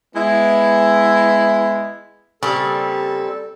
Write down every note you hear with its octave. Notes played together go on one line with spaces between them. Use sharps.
G#3 B3 E4
C#3 G3 A#3 C4 A4